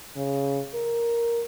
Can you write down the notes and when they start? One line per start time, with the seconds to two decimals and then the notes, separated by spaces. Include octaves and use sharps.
0.16 C#3
0.74 A#4